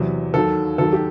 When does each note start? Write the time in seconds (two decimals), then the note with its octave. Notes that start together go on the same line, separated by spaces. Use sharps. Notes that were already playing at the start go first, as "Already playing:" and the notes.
Already playing: E2 C3 F#3
0.34 D#2 D#3 F#3 A4
0.78 D#2 D#3 F#3 A4
0.93 G4